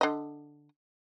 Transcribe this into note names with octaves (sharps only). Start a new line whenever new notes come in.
D3 D#5